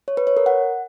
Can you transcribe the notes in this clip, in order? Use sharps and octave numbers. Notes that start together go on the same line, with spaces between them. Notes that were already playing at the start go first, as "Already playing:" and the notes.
C#5
B4
C#5
A#4
F#5